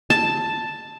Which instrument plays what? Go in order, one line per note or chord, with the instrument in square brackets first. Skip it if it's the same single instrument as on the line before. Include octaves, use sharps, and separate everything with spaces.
[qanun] A5